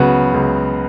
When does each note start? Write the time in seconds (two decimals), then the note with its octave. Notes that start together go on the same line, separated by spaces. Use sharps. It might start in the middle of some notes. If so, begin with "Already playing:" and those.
Already playing: C#2 C#3 F#3 B3 F#4
0.34 C#2